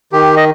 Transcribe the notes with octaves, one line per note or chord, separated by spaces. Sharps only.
D#3 G4
D#5